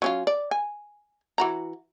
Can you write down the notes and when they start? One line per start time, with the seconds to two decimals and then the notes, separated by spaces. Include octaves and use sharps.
0.02 F#3 C#4 F4
0.27 D5
0.51 G#5
1.38 E3 F#4 A#5